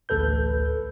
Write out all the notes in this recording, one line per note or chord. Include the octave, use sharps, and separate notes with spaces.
A1 D2 A4 B4 G6